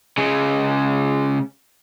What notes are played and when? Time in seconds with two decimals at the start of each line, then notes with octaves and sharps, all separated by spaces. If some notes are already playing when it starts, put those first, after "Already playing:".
0.18 C#3 G#3